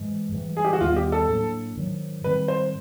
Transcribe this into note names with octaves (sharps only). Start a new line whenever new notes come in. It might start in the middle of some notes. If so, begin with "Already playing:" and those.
Already playing: G#2 E3 G#3
G#2 E3 G3
G#4
G4
F#4
D#2 D#3 G3 B3 F4
G4
A4
A2 F#3 A#3 D4
G#2 D#3 F#3
G#2 D#3 G3 C4 B4
C5